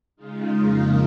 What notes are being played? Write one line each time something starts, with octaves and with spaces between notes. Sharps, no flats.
C#3 G#3 D#4 F4
F2 C#3 A#3 D#4